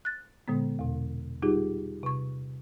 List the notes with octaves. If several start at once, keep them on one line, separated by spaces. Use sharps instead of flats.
F#6 A6
A#2 D3 G#3 B3
E2 B2
G3 D#4 F4 G4 G#4
C3 C#6